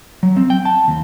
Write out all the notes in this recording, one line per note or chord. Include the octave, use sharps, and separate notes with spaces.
F#3
C4
G5
A5
D#2